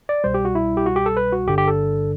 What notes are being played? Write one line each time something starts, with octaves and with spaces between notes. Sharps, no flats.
D5
C2 B2 G3 C5
G4
F#4
E4
G4
F#4
G4
A4
B4
F#4
G1 G2 D3 G4
G4
A4